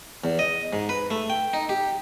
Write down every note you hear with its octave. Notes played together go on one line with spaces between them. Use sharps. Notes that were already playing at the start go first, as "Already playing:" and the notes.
E2
D#5
G#2
B4
A3
G5
D#4
G4